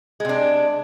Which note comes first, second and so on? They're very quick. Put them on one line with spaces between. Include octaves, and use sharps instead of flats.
G#3 C3 D4